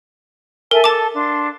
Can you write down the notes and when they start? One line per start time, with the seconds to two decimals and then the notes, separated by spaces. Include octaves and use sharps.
0.71 A4 A#4 E5 G#5
0.84 A4 A5 D6
1.15 D4 F5 C6